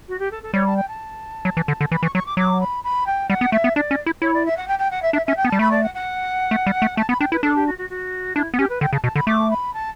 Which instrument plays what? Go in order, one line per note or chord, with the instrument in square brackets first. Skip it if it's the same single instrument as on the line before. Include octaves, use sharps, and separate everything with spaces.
[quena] F#4
G4
A4
A4
[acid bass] G3 [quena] C#5
[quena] A5
G5
A5
[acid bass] F#3
E3
D3
D3
[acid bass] E3 [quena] B5
[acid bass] E3 [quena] C#6
[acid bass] F#3 [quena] C#6
[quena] D6
[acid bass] F#3 [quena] D6
[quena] B5
B5
G5
[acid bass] G3 [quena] F#5
[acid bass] B3
[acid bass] A3 [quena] E5
[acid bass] B3
[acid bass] D4 [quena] D5
[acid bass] C#4
E4
[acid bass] E4 [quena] C#5
[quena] D5
E5
F#5
G5
G5
F#5
E5
[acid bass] D4 [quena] E5
[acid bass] C#4 [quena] E5
[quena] G5
[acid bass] B3
[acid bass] G3 [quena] A5
[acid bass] A3 [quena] B5
[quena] D5
F#5
F#5
[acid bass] A3
G3
A3
[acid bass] A3 [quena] A5
[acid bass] B3 [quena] B5
[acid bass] D4 [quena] G5
[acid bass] E4 [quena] B4
[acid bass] D4 [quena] A4
[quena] G4
F#4
F#4
F#4
[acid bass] D4 [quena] E4
[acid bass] B3
[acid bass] C#4 [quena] G4
[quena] B4
[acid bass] D3 [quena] G5
[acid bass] C#3 [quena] A5
[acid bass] B2 [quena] A5
[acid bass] D3 [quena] B5
[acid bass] A3 [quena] D6
[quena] B5
A5